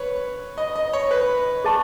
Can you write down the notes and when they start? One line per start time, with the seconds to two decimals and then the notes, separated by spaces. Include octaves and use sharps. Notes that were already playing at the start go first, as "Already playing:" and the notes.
Already playing: B4 C#5
0.58 D#5
0.76 D#5
0.93 C#5
1.11 B4
1.64 G#4 D#5 A5 C#6